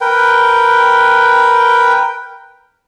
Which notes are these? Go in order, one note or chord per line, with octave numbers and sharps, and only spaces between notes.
A#4 B4 G5